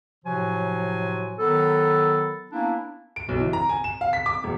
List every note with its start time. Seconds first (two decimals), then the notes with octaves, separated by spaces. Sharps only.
0.25 A2 C3 F3 F#3 F#4 G#5
1.38 D#3 F#3 B3 A4
2.52 A#3 B3 C#4 D4 E4
3.16 D7
3.29 B1
3.40 E3
3.53 A#5
3.69 G#5
3.84 E7
4.01 F5
4.13 B6
4.26 D6
4.44 E1